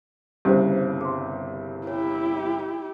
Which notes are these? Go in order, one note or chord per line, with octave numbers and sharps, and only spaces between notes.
G1 C2 G2 C#3 G4 C5
G#4 C6
E4 G4 C#5